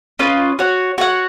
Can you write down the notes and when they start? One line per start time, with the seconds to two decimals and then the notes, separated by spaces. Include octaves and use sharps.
0.19 C#4 F4 B4 D#5
0.59 F#4 C#5 F#5
0.98 F#4 C#5 F#5